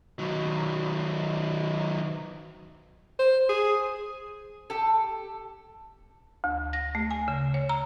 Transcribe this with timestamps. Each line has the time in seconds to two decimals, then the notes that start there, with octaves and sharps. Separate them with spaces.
0.19 D#3 F#3
3.19 C5
3.49 G#4
4.70 G4 A4
6.44 D2
6.73 A#6
6.95 A3
7.11 G#5
7.28 C#3
7.54 C#5
7.69 A#5